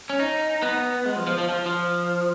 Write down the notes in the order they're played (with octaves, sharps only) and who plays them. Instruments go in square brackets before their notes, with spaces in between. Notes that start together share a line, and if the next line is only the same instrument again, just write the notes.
[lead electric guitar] C#4
D#4
B3
G#3
F3
F3
F3
F3
F3